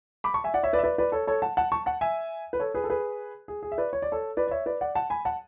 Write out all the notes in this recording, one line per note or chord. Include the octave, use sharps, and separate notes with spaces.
B5 D6
A5 C#6
E5 G#5
D5 F#5
C#5 E5
B4 D5
E5
B4 D5
B4 D5
A4 C#5
A4 C#5
F#5 A5
F#5 A5
A5 C#6
F#5 A5
E5 G#5
B4
A4 C#5
G#4 B4
A4
G#4 B4
G#4
G#4
E5
B4 D5
C#5
D5
A4 C#5
B4 D5
D5
C#5 E5
B4 D5
D5 F#5
F#5 A5
G#5 B5
F#5 A5